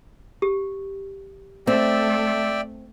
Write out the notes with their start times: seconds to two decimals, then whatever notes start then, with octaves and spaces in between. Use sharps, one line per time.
0.42 G4
1.67 A3 C4 D5 E5 G5